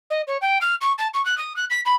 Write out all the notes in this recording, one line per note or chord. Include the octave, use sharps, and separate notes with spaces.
D#5
C#5
G5
F6
C#6
A5
C#6
F#6
D#6
F#6
B6
B5